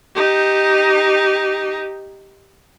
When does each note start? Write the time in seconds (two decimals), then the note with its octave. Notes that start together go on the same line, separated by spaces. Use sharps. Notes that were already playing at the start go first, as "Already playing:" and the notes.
0.15 D#4 G4